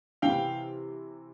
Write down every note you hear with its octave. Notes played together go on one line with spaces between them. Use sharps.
C3 E3 F5 G5